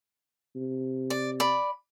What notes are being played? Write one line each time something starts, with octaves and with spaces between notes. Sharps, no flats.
C3
D5
D5 B5